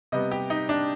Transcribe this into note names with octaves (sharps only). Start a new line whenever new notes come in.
C3 G3 B3 D#5
G4
D#4
D4